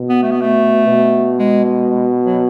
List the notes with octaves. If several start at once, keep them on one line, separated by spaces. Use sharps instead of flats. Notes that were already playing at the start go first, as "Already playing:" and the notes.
Already playing: B2
B3
A3
B3
A3
B2
G#3
G#3
G#3
F#3